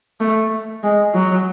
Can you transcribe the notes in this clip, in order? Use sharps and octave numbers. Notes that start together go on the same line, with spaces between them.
A3
G#3
F#3